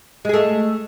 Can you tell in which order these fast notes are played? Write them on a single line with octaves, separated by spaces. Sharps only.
G#3 G#4 A3